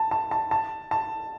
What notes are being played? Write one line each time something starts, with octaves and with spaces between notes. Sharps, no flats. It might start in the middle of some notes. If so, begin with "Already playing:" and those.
Already playing: A5
A5
A5
A5
A5